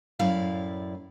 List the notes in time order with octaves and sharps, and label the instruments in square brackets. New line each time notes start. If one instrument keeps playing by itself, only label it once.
[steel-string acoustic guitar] F#2 A2 E4 D5 F5